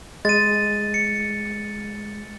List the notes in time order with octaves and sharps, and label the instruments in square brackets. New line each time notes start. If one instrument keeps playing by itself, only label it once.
[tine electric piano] G#3 [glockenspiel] A6 D#7
[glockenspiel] C#7